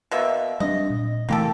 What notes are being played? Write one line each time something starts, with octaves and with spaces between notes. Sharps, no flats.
B2 A#3 E5
G3 C4 D4 D#5
A#2
C3 E3 A3 A#3 G4 A4